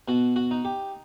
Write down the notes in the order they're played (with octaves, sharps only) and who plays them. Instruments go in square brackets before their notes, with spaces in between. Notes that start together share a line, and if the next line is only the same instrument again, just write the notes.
[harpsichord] B2 F#4
F#4
D#4
G4